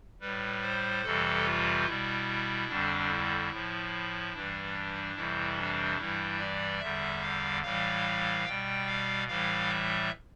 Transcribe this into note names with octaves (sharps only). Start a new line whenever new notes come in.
A2 G3 B4
C5
F2 C3 E3 G3 A4
F4
B2 G3 E4
F2 D3 G3 D4
E4
A2 F3
G2 E3 G3 D4
F2 C3 E3 G3 E4
D4
G2 E3 G3 E4
D5
E2 D3 G3 E5
F5
A2 E3 G3 F5
B2 G3 G5
F5
A2 E3 G3 F5
E5